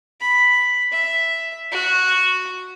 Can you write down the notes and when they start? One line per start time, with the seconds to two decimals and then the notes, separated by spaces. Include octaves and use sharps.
0.21 B5
0.92 E5
1.72 F#4